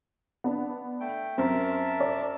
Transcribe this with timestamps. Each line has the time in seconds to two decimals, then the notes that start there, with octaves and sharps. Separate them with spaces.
0.44 B3 D4
1.00 A3 G5
1.38 F#2 C4 A#4 E5 A5
2.00 D5